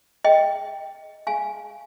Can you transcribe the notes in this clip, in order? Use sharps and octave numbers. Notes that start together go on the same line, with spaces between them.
D#5 G5
F5 G#5